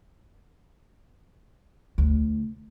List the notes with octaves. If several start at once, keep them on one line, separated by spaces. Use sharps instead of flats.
D2